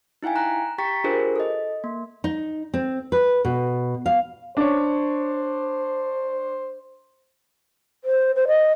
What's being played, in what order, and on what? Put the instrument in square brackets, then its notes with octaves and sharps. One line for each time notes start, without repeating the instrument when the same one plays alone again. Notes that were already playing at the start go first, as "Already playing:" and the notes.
[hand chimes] D#4 E4 F5 G5 G#5
A#5 F#6
G4 G5 A#5 C#6 A6 B6
D4 F4 G4 G#4 A#4 C5
A4 D#5
A#3
[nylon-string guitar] D#4
C4
B4
B2
F5
[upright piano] D4 C#5 [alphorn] C5
[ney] C5
C5
D#5